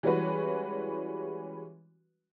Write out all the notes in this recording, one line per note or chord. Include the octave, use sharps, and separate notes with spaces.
E3 G3 G#3 C#4 F#4 B4